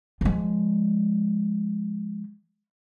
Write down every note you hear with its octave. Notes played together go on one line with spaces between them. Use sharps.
F3 G#3